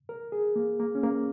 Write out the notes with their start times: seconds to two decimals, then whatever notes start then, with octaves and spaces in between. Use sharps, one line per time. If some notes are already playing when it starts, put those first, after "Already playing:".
0.09 A#4
0.32 G#4
0.56 A#3
0.80 A#3
0.95 C#4
1.03 A#3